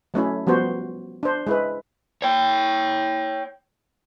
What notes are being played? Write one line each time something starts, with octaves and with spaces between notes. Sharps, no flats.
F#3 A3 C#4 E4
F3 G3 B3 F#4 C5
D4 C5
G#3 E4 B4
C#5 G5